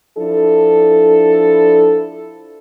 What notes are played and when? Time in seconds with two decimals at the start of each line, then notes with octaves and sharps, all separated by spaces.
0.17 F3 D4 E4 A4